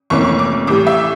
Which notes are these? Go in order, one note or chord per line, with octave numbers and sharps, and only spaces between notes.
F1 F2 E3 A#3 C#4 C#6
C#6
D6
A2 E3 G3 D6
E5